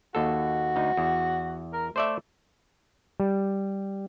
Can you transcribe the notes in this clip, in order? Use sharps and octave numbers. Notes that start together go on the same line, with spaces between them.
D#2 F#4 A4
D2 D#4
E2
A#4
A3 C5 D5 E5
G3